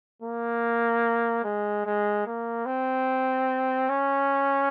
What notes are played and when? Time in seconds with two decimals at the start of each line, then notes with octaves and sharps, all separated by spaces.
0.22 A#3
1.44 G#3
1.85 G#3
2.26 A#3
2.66 C4
3.89 C#4